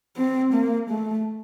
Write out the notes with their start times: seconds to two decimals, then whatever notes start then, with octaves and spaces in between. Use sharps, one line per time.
0.17 C4
0.54 A#3
0.90 A3